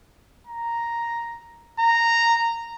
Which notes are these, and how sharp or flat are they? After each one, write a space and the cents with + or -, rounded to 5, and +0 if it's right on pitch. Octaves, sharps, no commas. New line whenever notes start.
A#5 +0
A#5 -10